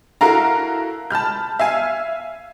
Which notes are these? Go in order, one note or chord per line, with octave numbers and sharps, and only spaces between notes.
E4 F#4 A4 A#4 F5 A#5
A5 B5 F6 G6
E5 F5 G#5